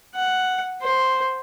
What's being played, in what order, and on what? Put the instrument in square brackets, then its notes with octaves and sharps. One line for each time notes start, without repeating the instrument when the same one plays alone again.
[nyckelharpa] F#5
C5